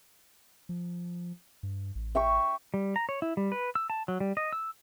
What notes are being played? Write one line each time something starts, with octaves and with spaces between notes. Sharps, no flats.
F3
G2
A1
E5 G5 C#6
G3
A#5
C#5
E4
G3
B4
E6
A5
F#3
G3
D#5
E6